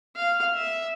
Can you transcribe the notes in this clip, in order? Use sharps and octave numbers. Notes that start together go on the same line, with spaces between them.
F5
E5